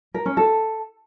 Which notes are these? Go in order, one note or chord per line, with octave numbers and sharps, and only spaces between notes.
A#4
C#4
A4